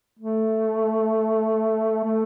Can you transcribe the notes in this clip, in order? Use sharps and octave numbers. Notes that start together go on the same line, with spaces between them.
A3
A3